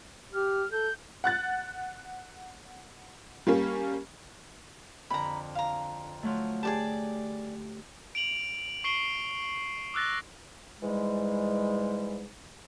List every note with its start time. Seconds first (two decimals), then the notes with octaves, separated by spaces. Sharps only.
0.33 G4 F6
0.71 A4 G6
1.24 F#5 F#6 A6
3.47 G3 A#3 C#4
5.10 F2 D3 A#5 B5
5.55 F5 A#5
6.23 F3 F#3 A3
6.63 G4 G#4 D5 A5
8.15 D7 F7 F#7
8.84 C#6 C7 D7 G7
9.94 D6 E6 F#6 A6 A#6
10.82 G#2 E3 G3 G#3